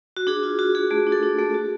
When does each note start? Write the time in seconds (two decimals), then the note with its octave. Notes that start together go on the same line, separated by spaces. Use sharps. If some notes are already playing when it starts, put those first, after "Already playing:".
0.17 F#4
0.27 D4 G#4
0.43 F4
0.59 F4 F#4
0.75 F4 G#4
0.91 A3 G#4
1.07 D4
1.12 A4
1.23 D4
1.39 A3
1.54 F#4